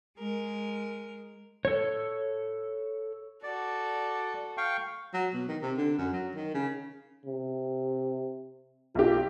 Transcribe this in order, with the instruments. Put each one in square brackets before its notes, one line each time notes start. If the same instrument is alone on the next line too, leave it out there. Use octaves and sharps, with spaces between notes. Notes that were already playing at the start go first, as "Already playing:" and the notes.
[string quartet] G#3 A#4
[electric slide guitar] A4 C#5
[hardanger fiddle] F#4 A4 [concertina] D5
[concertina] F5 G5 C#6
[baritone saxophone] F#3
B2
D#3
C3
D3
F#2
F#3
D#3
C#3
[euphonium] C3
[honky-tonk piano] B1 G4 [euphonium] F4